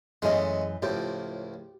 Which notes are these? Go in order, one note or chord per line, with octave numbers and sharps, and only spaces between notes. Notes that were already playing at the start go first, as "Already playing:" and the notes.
F#2 E3 G#3 A3 C#4 D#5
C#2 A2 F3 G4